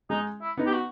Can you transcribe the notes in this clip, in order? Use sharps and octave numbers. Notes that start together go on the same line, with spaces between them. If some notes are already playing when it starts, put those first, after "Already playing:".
G#3 D#4
E4
B3 D#4
G4
F#4